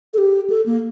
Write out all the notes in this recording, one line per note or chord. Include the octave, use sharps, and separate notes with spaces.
A4
G4
A4
A#3